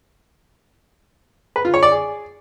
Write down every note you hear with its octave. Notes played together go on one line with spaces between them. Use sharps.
B4
F4
C#5
D5
G#4